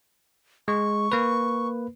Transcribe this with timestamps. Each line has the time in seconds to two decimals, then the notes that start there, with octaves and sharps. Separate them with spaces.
0.68 G#3 C#6
1.12 A#3 B4